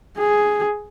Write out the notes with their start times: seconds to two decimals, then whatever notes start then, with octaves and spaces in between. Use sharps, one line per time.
0.19 G#4